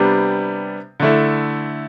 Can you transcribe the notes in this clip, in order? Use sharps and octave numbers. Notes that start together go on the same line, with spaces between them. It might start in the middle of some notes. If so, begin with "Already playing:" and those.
Already playing: C3 G3 B3 D4
D3 A3 E4